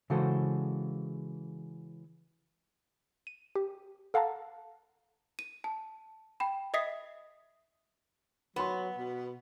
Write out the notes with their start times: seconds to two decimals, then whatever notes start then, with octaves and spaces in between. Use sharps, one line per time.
0.10 C#3 E3 G#3 F#4 A4 C5
3.27 D#7
3.56 G4
4.14 A4 F5 F#5 A5 A#5
5.39 D#7
5.64 A5
6.40 G5 B5
6.74 D#5 E5 D#6 B6 C7
8.56 F#3 B3 B5 C6
8.98 B2